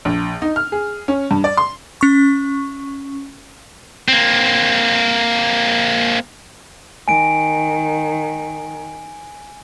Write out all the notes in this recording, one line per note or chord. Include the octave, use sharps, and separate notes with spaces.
A#1
D#4
F6
G#4
C#4
G2
D5
C6
C#4 C#6
A#3 C4
D#3 G#5 D7